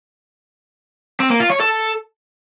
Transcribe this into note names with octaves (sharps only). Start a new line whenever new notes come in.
C4
A#3
F4
C#5
A4